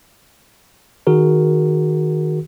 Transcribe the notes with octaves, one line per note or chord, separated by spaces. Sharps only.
D#3 F#4 G#4 A#4